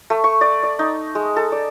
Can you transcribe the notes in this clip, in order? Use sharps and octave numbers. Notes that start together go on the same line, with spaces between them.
A3
C#6
D5
D5
D#4
G#3
A4
D5